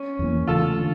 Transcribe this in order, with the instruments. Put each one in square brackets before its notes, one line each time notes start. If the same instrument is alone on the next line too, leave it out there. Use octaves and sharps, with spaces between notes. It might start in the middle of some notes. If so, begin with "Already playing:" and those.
Already playing: [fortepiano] C#4
[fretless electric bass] E2 E3 A#3
[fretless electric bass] E2 C#3 E3 A3 [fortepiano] F4 A4
[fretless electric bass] D3